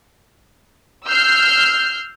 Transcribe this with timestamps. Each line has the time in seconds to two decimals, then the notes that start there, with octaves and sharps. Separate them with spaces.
1.07 E6 F6 G6 C7